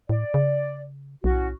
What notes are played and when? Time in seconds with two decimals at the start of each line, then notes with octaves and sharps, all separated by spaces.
0.09 A2 D5
0.34 C#3
1.24 B1 A2 C#4 F#4